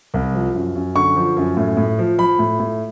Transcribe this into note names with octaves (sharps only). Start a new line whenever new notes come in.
C2
F3
F#2
F#2
D3 C#6
F3
F#2
A2
A2
F3
F3 B5
A2
A2